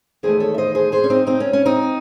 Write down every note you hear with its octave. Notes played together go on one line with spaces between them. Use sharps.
E2 D#3 A3 G#4 C5
A4 C#5
E5
C5 D#5
G#4 C5
G#4 C5
C#4
C4 D#4
C4 D#4
C#4
C#4
C4 D#4